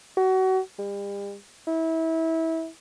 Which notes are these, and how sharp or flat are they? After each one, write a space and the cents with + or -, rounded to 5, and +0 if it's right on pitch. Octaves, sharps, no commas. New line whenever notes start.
F#4 +30
G3 +40
E4 -25